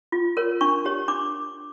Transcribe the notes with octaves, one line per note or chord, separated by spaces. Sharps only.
F4
A#4 C#5
D4 C#6
G4 C#5
D4 D6